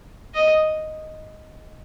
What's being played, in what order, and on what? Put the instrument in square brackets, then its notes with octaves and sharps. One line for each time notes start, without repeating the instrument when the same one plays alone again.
[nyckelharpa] D#5